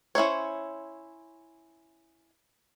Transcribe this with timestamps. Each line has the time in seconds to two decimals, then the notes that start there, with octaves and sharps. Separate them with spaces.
0.15 C#4 E4 C5 C#5